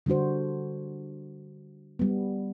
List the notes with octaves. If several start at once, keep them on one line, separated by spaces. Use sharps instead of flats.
D3 G3 D4 F#4 C5
G3 B3